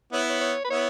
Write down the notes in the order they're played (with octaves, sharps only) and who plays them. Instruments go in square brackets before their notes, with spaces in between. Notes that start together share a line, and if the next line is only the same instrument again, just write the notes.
[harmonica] B3 E4 [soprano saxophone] C#5
[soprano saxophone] C#5
C#5
B4
[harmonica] B3 E4 [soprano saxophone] C#5